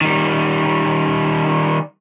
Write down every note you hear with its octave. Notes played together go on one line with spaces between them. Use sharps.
D#3 G3